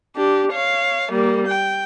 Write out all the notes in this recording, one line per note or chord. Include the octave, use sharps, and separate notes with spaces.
D4 G4
C#5 F5
G3 A#3
G5